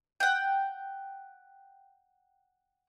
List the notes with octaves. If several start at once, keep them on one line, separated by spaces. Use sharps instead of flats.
F#5 G5